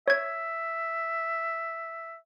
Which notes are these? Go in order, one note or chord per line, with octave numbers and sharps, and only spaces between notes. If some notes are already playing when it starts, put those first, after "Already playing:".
C#5 E5 G#6